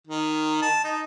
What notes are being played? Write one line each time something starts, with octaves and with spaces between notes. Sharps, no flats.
D#3
A5
D#4